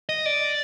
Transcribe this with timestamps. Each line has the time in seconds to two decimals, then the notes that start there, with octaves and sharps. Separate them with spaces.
0.09 D#5
0.26 D5